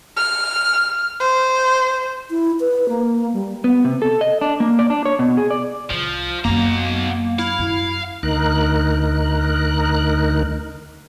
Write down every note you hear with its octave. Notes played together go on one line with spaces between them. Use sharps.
F6
C5
E4
B4
A#3
G3
B3
C3
A4
D#5
D4
A#3
D5
D4
C#5
B2
G#4
D5
C2 F3
F#2 B2 F#3 A#3 A#5
E4 F5
F#2
D2 D#4 A#4 F#6